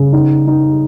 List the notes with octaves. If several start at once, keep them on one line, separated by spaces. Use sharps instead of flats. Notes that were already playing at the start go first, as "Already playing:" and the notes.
Already playing: C#3
D#4
D#4